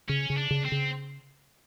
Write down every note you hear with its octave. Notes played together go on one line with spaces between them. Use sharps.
C#3 C#4
C#3
D4
C#3
C4
C#3